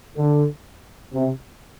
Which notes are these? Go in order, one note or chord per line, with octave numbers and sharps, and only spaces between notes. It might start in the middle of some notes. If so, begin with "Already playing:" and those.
D3
C3